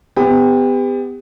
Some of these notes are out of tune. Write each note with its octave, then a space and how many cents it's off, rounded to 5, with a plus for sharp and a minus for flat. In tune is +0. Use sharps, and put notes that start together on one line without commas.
B3 +30 G4 +35